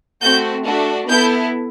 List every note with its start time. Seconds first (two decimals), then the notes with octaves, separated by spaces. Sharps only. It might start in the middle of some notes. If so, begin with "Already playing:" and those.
0.21 A3 C4 F#4 G6
0.65 A3 D4 F#4
1.09 B3 E4 A4 G6